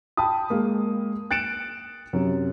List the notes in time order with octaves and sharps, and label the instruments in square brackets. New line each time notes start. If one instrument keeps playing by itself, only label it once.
[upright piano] G5 A5 B5 D#6
G#3 A#3
F#6 A6 C#7 D7 E7
F#2 C3